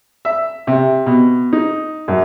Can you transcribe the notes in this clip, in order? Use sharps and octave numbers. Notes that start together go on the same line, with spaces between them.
E5
C3
B2
D#4
F#2